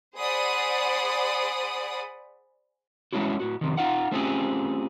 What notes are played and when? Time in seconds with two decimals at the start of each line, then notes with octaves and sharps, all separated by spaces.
0.17 G#4 C5 D5 F#5 B5 D#6
3.13 G#3 A3 C#4 E4 F#4
3.40 A2 F#4
3.61 F2 C3 D#3
3.77 D#4 F4 F5 F#5
4.12 A3 C4 C#4 F4 G4 G#4